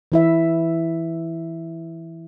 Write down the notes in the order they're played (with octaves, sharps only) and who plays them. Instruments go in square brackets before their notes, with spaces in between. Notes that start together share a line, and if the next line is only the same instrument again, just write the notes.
[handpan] E3 E4 E5